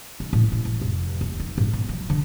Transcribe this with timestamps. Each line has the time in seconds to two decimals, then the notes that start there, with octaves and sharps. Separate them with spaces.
0.20 D#4
0.33 A2
0.52 G#3
0.65 A1
0.81 F1
1.21 D#2
1.40 D#4
1.58 G#2
1.73 B2
1.89 F#3
2.10 D3